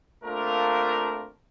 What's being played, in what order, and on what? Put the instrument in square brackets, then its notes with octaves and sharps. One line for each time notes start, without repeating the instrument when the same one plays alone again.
[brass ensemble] A3 A#3 C4 D4 F4 A#4